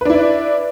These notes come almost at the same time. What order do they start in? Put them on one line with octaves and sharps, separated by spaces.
B4 D4 E4 D5